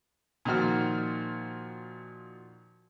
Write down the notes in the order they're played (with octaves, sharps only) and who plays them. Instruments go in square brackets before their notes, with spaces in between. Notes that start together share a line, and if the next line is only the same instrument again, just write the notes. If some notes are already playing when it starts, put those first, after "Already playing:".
[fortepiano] A#2 D#3 F3 F#4 F6